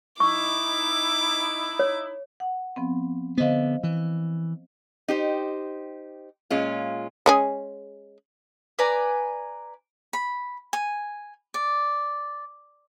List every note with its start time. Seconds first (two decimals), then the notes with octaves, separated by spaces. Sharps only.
0.20 D#4 E4 C#6 D6
1.79 C#5
2.40 F#5
2.76 F3 B3 C4
3.38 D3 B3 C5 D#5 F5
3.83 E3
5.08 D#4 G4 C5
6.50 A#2 G#3 C#4 F4
7.26 G#3 C#4 G#4
8.79 B4 D5 G#5 A#5
10.13 B5
10.73 G#5
11.54 D5